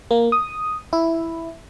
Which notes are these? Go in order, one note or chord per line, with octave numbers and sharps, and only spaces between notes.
A#3
D#6
E4